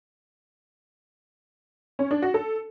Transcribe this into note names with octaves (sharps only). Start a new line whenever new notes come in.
C#4
D4
F#4
A4